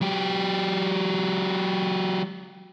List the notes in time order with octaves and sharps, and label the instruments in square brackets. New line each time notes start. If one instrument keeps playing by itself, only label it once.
[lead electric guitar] F#3 G4